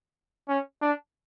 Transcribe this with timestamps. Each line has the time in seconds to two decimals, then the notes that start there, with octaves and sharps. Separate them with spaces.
0.49 C#4
0.82 D4